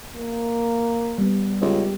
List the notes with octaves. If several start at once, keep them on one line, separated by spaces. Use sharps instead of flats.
A#3
G3 B3
C#2 G4